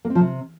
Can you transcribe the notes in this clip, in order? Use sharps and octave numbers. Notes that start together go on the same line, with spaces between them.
A#3
C4
F3
C3